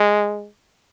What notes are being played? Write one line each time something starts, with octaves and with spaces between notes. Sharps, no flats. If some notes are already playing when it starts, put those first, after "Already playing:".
Already playing: G#3